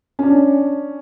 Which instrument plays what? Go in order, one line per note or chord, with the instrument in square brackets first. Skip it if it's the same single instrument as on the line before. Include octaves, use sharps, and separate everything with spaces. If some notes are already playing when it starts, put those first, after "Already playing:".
[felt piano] C#4 D4